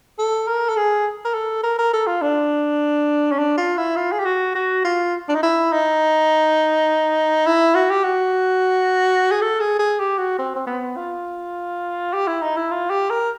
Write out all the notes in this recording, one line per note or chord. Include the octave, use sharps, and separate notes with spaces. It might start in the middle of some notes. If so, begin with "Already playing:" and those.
A4
A#4
A4
G#4
A#4
A4
A#4
A#4
A4
F4
D4
C#4
D4
F4
E4
F4
G#4
G4
F#4
F#4
F4
D4
D#4
E4
D#4
E4
F#4
G4
F#4
G#4
A4
G#4
G#4
G4
F#4
C4
C4
B3
F4
G4
E4
D#4
E4
F4
G4
A#4